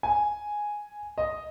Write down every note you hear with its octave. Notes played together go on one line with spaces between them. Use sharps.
G#5
D#5